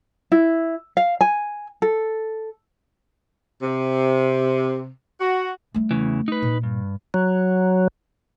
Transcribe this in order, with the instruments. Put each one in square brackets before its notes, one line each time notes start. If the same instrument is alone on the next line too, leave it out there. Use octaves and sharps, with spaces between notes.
[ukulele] E4
F5
G#5
A4
[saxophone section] C3
F#4
[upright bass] G3 A3
[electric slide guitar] E2 C#3 E3
D#4 B4
[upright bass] A#2
[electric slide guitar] G2
[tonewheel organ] F#3